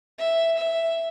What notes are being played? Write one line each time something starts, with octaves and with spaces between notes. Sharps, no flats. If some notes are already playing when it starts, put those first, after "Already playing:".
E5
E5